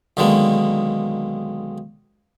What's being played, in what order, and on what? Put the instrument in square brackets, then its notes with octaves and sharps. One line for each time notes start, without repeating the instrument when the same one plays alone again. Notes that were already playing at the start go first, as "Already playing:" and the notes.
[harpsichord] B1 D3 D#3 G#3 A#3